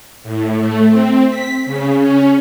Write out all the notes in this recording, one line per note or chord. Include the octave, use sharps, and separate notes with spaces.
A2
A3
C4
B6
C#3
C#4